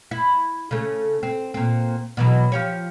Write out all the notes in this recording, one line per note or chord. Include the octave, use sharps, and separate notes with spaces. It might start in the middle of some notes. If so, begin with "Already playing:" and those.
E4
C#3 A3
C4
A#2 C4
B2 E3 F#3
F3 G4 C#5